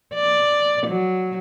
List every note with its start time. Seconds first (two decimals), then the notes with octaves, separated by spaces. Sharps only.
0.15 D5
0.86 F#3